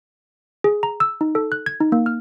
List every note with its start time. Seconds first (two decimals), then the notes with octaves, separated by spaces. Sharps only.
0.64 G#4
0.83 A#5
1.00 E6
1.21 D#4
1.35 A4
1.52 F#6
1.66 G#6
1.80 D#4
1.92 A#3
2.06 F6